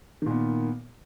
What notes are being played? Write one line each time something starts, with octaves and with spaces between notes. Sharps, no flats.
A#2 D#3 B3